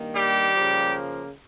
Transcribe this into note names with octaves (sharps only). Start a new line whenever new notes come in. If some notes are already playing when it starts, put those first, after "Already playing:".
Already playing: G2 D#3 A#3
G3 G4
C#3 F3 A#3